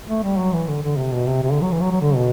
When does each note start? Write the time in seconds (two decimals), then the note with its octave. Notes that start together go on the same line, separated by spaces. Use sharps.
0.09 A3
0.24 G3
0.38 F#3
0.53 E3
0.68 D3
0.83 D3
0.98 C3
1.13 B2
1.27 C3
1.43 C3
1.53 D3
1.62 F#3
1.72 E3
1.81 F#3
1.92 F#3
2.01 D3
2.16 B2